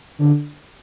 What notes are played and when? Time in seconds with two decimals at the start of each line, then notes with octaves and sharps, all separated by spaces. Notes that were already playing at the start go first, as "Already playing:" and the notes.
0.19 D3